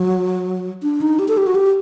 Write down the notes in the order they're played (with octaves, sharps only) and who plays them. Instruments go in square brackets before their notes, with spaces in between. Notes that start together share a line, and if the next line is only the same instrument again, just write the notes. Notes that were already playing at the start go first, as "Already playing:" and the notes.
Already playing: [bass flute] F#3
D4
D#4
G4
A4
G4
F#4
G4